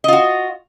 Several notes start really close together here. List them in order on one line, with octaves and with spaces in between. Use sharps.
D#5 F4 F#4